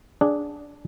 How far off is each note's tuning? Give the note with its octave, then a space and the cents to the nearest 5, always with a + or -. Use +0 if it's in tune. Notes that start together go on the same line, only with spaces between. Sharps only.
D4 -10 G#4 +0 F#5 +0